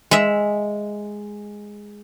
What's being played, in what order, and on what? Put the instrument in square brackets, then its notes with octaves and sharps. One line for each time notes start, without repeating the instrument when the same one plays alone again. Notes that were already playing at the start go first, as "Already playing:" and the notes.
[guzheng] G#3 E5